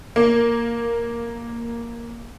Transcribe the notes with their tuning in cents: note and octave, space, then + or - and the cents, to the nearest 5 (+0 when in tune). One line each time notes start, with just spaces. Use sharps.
A#3 +0